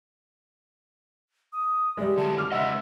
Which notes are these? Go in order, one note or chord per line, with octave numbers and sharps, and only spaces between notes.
D#6
G3 G#3 E5
D3 F#3 A5
D6 F6
C#3 G#3 D#5 E5 F#5 E6